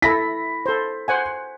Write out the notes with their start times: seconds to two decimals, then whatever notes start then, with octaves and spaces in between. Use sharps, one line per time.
0.02 E4 A4 B5 A#6 B6
0.66 A4 C5
1.08 C5 F#5 G#5